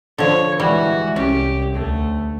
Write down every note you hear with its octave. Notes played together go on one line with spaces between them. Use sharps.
D3 F3 C#5
E3 G3 G#3 F#4
C2 C#4 G4
D2 A3